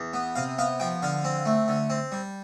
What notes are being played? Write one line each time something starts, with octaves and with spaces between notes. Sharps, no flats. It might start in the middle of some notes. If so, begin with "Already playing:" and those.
Already playing: E2
B3
C3 F5
B3 F5
F3 G5
D3 F5
C4
A3
D3
C4
G3